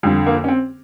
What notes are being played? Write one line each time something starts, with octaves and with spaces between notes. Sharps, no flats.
F2 D3 G3
A#3
C#4
C4